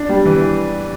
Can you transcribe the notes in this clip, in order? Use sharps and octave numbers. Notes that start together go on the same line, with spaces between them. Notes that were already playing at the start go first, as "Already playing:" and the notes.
Already playing: D4
G3
E3